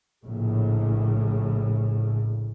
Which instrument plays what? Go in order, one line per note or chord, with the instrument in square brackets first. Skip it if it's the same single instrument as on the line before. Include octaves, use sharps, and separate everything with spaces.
[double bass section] A#1 A2 C#3